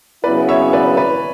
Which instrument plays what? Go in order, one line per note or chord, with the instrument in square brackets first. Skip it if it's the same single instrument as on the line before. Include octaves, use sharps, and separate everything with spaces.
[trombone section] C#3 F#3 B3 E4 [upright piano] B4 D5
[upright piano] C#5 E5
B4 D5
B4 D5